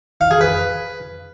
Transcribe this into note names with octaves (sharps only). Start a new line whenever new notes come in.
F5
G#4
B4